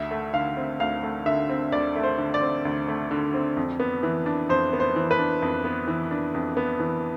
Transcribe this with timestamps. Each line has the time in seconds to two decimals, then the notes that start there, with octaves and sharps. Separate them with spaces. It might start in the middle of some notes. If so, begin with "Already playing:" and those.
Already playing: D2 E5
0.11 A3
0.34 D3 F5
0.57 C4
0.80 D2 F5
1.03 A3
1.26 D3 E5
1.49 C4
1.72 D2 D5
1.96 A3
2.04 C5
2.18 D3
2.34 D5
2.41 C4
2.65 D2
2.88 A3
3.11 D3
3.34 C4
3.57 F2
3.80 B3
4.03 E3
4.26 D4
4.49 F2 C5
4.73 B3
4.80 C5
4.96 E3
5.11 B4
5.19 D4
5.42 F2
5.64 B3
5.88 E3
6.11 D4
6.35 F2
6.57 B3
6.80 E3